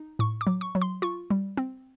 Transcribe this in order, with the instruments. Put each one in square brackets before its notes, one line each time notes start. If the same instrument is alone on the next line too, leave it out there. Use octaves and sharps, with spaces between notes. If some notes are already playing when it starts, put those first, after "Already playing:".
Already playing: [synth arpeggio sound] D#4
A2 C#6
D6
F#3
C#6
F#3
C6
F4 C#6
G3
C4